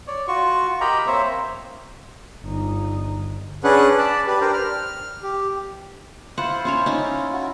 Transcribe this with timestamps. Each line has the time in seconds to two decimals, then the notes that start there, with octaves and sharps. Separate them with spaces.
0.07 C#5 D5
0.28 F4 F#4 C#6
0.81 G4 A#4 D#5 G5 A#5 B5
1.07 A#3 C4 C5 C#5 E5
2.44 G1 D#4
3.64 C#4 D4 G#4 B4 F#5
3.98 D5 A5 B5
4.27 G4 B4
4.41 D4 G4 A#4 C5
4.54 F6
5.23 G4
6.38 E4 F4 C5 F#5
6.65 C#4 C5 C#5
6.86 C#4 D#4
7.33 E4 F#4